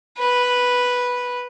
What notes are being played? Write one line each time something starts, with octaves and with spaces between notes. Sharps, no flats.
B4